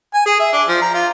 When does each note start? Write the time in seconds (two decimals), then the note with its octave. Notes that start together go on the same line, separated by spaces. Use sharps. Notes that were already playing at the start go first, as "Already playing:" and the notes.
0.14 G#5
0.26 G#4
0.40 E5
0.52 D4
0.68 F3
0.81 A#5
0.94 F4